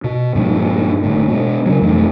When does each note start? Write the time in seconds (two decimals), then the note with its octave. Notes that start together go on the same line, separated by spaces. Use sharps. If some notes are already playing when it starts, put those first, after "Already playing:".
0.04 B2
0.35 G2 A#2 F3 G#3
1.03 G1 A2
1.28 B2 G#3
1.66 C#3 F#3
1.82 F2 B2 E3 A3